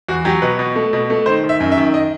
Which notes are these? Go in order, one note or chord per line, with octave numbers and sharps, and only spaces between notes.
E2 F#4
F#3 G4
B2 B4
B2
A3
B2
A3
D#3 C5
D#3
E5
F#2
E5
D#3
D#5